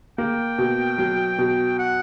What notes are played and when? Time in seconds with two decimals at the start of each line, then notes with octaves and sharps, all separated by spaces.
0.18 A#3 G5
0.58 B2
0.98 F#3
1.38 B2
1.79 F#5